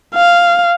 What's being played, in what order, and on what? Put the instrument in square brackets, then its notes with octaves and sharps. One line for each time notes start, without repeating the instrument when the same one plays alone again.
[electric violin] F5